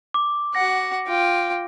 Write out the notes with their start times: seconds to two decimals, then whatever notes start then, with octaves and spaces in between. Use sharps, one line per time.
0.14 D6
0.55 F#4 F#5 A#6
1.07 F4 G5